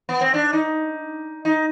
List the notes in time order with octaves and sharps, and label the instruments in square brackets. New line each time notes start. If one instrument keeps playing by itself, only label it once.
[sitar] B3
C4
D4
D#4
D#4